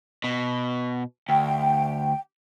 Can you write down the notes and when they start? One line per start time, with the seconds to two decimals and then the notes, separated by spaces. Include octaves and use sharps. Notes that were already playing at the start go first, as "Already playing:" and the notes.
0.24 B2
1.29 D2 G5